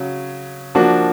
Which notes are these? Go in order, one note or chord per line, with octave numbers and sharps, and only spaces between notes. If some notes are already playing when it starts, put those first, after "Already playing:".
Already playing: C#3 F#3
F3 A#3 D4 F#4